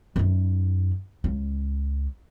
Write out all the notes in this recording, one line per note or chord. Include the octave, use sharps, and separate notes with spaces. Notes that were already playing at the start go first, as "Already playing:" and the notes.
F#2 D#4
C#2